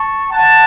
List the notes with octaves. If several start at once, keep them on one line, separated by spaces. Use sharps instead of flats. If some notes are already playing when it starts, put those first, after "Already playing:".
Already playing: A5 C#6
F#5 A5